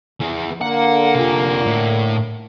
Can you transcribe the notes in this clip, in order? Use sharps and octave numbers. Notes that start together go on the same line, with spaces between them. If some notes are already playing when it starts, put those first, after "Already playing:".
E3 G#4
D3 A#3 F#5
C3 F4
A2